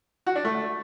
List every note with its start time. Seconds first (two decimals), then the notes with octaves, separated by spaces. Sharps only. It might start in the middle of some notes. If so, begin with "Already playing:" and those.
0.27 F#4
0.36 D4
0.45 A3